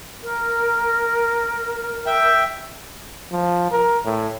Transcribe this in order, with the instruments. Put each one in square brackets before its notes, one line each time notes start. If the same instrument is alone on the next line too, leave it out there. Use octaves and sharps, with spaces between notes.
[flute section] A#4
[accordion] E5 G5
[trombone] F3
A#4
A2